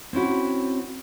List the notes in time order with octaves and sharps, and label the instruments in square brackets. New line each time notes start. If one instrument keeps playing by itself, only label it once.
[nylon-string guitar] C4 C#4 E4 F#4